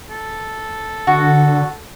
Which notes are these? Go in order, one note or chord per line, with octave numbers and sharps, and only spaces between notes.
A4
D3 F#4